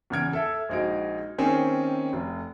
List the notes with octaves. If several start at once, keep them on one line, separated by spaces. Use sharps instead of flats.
E2 C#3 F6 G#6 D7
A4 E5
A#1 G#3 D#4 F#4 D7
D#3 A#3 C4 C#4 G#4
F1